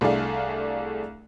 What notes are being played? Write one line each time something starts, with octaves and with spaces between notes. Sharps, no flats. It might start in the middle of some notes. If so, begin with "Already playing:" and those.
C2 A3 D4 G#4 D5 F5